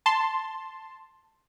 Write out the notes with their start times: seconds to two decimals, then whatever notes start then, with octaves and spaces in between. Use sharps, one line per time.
0.06 A5 C6